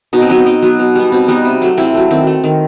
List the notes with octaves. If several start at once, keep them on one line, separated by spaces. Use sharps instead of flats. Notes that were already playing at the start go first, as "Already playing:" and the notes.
B2 D#4
C4
F#3 B3 D#4
C4
B2 D#4
F#3 B3
B2
G3 B3
B2 C4
G3 B3 D#4
C3
F#3 A3
C3 C4 E4
F#3 A3
D#3 C4
A3
D#3